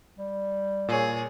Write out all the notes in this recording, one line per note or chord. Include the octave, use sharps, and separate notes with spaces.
G3
A#2 G#4 C#5